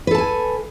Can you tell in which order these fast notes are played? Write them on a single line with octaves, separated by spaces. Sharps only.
B4 A4 A5 G#5